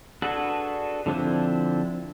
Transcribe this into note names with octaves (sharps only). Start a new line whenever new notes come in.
D4 F#4 G#4 A4 B4
D3 F3 C4 D4 E4